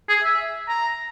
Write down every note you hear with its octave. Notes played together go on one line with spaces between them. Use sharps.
G#4
E5
A#5